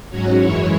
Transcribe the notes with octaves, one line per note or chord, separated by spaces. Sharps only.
G#2 F#3 C#4 F#4 C#5
F#2 E3 G#3 E4 C#5